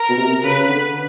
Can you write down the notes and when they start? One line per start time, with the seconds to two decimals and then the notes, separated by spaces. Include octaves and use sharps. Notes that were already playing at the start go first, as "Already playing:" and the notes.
Already playing: A#4
0.09 B2
0.17 C3
0.43 C#3 B4
0.69 D3